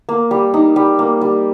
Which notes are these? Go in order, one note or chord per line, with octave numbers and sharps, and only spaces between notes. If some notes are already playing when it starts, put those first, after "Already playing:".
A#3
G3
D#4
G3
A#3
G3